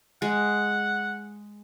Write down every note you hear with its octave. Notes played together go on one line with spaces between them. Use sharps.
G#3 F#5